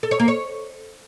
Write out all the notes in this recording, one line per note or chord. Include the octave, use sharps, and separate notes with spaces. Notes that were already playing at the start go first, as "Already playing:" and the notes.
A4
C#5
A#3
C#5